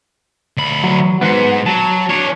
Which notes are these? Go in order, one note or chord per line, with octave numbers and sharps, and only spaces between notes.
D2 B5
F#3
G#2 B3 B4 C5 F#5
F#3 A5
D4 C#5